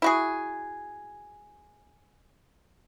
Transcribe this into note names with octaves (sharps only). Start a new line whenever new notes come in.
E4 F#4 G#4